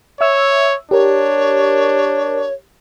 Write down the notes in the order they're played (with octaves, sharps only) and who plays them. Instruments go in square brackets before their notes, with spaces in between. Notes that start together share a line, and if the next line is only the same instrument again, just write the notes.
[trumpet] C#5 [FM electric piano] E5 E6
[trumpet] D4 [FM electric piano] G4 A#4 [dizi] C#5